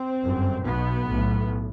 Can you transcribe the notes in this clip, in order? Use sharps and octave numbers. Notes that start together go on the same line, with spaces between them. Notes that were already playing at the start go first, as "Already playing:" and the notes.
Already playing: C4
G1 F#2
B1 B2 B3
B1 A2